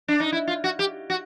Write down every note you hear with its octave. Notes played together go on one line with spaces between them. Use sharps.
D4
D#4
E4
F4
F#4
G4
F#4